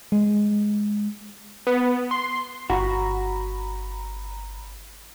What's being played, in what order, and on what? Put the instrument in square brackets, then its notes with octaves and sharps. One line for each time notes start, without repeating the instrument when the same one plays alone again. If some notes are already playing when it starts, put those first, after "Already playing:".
[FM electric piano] G#3
[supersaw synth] B3
C6
[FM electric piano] G1 A#5 B5 [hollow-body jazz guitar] F#4